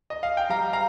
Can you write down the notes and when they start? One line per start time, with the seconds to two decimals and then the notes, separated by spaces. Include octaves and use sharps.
0.10 D#5
0.23 F5
0.37 G5
0.50 G3 F5 A#5
0.73 F5 A#5